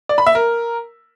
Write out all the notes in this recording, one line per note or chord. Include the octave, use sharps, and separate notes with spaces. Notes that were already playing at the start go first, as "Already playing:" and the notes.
D5
B5
E5
A#4